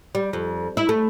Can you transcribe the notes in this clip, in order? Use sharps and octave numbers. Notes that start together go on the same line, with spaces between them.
G3
F2
E4
A3